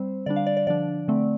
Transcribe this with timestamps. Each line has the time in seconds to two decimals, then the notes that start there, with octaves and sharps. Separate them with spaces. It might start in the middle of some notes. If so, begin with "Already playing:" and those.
Already playing: G3 C4 C5
0.26 D3 G3 D4 D5
0.36 F5
0.47 D5
0.57 D5
0.67 D3 F3 D4 D5
1.08 D3 A3 C4